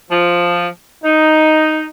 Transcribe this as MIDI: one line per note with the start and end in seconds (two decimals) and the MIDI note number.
0.11 0.67 53
1.03 1.85 63